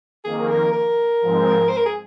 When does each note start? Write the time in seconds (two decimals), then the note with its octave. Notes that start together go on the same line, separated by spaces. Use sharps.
0.24 F2 D#3 A#3 G#4
0.49 A#4
0.72 A#4
1.21 G#2 F3 G#3 C4
1.69 C5
1.77 A#4
1.86 G#4